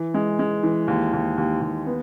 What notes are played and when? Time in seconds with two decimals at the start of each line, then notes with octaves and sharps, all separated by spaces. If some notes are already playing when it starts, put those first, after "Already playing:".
Already playing: E3
0.14 G#3
0.39 G#3
0.63 E3
0.88 D#2
1.13 D#2
1.38 D#2
1.61 D#2
1.87 B3